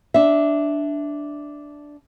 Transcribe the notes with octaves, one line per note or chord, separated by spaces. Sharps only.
D4 E5